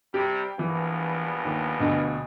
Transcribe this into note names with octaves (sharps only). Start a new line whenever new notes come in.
C3 G3 G4
A#1 G2 E3 B3
D#2
D2 B2